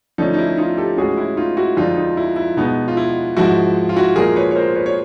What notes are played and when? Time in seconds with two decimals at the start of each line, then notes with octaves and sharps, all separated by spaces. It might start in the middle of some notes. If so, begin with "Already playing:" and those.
0.18 D3 F3 A3 C#4 D#4
0.34 D#4
0.38 E4
0.58 D#4 F4
0.77 G4 A4
0.97 A2 E3 G#3 C#4 F#4 G#4
1.18 E4 F#4
1.37 D#4 F4
1.57 E4 F#4
1.77 F2 D3 F3 G#3 D#4 F4
1.96 D#4
2.17 E4
2.36 E4
2.57 B2 G#3 B3 D#4
2.88 F4
2.97 E4
3.37 G#2 F3 G#3 E4 F#4
3.89 F4
3.96 E4 F#4
4.16 A#2 F3 G#3 G#4 A#4
4.36 B4 C#5
4.51 C#5
4.55 A#4 C5
4.76 B4 C#5
4.86 C#5